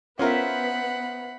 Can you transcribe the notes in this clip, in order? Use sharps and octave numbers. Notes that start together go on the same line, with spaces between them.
B3 C#4 F4 A#4 C5 E5 F#5 B5